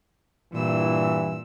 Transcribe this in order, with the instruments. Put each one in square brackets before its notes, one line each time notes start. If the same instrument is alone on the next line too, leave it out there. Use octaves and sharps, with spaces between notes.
[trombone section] G2 E3 [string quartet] A#2 E6